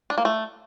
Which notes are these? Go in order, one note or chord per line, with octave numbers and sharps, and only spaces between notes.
D4
A#3
A3